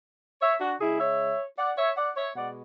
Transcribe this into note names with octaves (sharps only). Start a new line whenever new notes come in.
C#5 E5
D4 F#4
C#3 G#3 E4 G#4
C#5 E5
D5 F#5
C#5 E5
D5 F#5
C#5 E5
B2 G#3 D5 F#5